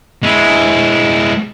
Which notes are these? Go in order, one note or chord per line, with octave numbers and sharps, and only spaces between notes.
G#3 E4